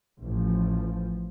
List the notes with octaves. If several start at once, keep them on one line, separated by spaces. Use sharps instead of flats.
A1 F3